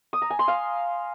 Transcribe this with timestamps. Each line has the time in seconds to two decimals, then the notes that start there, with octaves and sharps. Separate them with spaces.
0.13 D#6
0.22 A#5
0.30 G#5
0.39 C6
0.48 F5